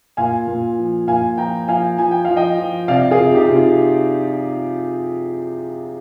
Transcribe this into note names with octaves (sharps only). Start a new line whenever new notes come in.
A#2 F5 G#5
A#2
F3
A#2 F5 G#5
F3 G5 A#5
F3 F5 G#5
F3 G#5
G5
F3 F5
D#5 G5
F3
C3 D5 F5
F4 G#4
C3
D#4 G4
C3
F4